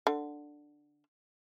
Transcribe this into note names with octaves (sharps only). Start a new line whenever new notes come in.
D3